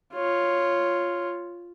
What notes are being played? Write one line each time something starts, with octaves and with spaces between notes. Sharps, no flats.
F4 C#5